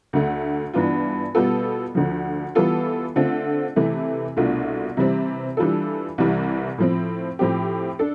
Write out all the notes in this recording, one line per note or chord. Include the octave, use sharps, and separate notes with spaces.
D2 D3 A3
G2 E3 B3 D4 F4
B2 G3 B3 F4 A4
D2 D3 F3
E3 G3 B3 F4 A4
D3 A3 C4 F4 A4
C3 E3 A3
C2 B2 A3 D4 F4
C3 E3 G3 C4
E3 G3 D4 F4 A4
C2 C3 E3 G3
A2 F3 C4
A2 F3 C4 G4
D4 A4